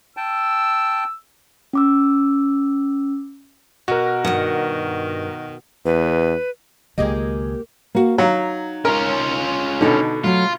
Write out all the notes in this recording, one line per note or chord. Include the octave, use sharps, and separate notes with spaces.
G5 A5 E6
C#4 D6 E6
B2 F#4 A#4
G2 D#3 F#5
E2 B4
C#2 D#3 A#3 G4 G#4 D#5
A#3 F#4
F#3 D#4 F5
C#4 F4 A#4
B2 D3 D#4 A4
F#3 A3 F4